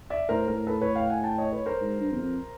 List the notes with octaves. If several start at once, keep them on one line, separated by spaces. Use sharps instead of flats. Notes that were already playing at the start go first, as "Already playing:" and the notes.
D5 E5
A2 A#4 C5
A2 A#4
A4 B4
B4 C#5
F5 G5
F#5 G#5
G5 A5
C#5 D#5
B4 C#5
A#4 C5
G#2
G2
E2
F2